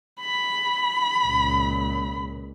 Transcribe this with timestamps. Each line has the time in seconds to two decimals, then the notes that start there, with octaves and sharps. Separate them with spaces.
0.21 B5
1.26 C#2 A#2